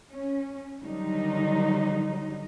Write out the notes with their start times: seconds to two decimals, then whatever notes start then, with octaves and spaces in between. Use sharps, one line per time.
0.13 C#4
0.81 D3 D#3 F#3 G3 D#4